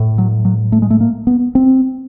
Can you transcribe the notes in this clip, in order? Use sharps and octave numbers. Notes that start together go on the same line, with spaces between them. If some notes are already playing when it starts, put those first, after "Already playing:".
Already playing: A2
F#3
F#3
A3
G#3
A3
A#3
B3
C4